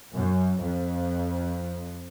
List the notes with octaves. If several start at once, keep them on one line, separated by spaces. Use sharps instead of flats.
F#2
F2